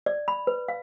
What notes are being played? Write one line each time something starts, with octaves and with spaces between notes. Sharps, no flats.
D5
B5
B4
F5